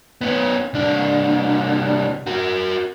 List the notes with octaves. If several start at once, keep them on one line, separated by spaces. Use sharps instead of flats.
B3 C#4
C2 D4
F#4 A#4